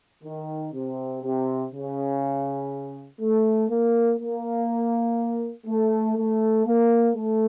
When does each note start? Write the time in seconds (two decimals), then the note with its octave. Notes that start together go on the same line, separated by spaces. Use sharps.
0.24 D#3
0.73 C3
1.22 C3
1.72 C#3
3.21 A3
3.69 A#3
4.19 A#3
5.66 A3
6.17 A3
6.65 A#3
7.15 A3